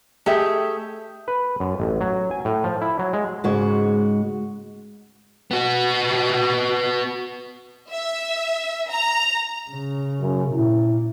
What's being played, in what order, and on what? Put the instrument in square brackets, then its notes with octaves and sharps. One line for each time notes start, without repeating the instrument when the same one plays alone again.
[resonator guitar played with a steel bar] A3 G4 G#4 E5
[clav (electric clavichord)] B4
F#2
A1
F#3
G#5
A2
F3
E4
F#3
G#3
[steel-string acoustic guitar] G#2 C#3 G#3 F#4
[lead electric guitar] B3 F#4
[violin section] E5
A#5
[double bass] C#3
[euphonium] F#2
[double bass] A#2 [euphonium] E4